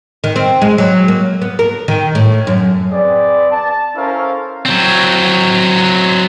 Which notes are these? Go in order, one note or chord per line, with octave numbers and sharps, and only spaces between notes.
D#3
C4
G#3
F#3
A#3
B3
A#4
D#3
A2
F#2
C4 G#4 B4 D5
A5
C#4 E4 A4 A#4 C5 F5
F#3 C4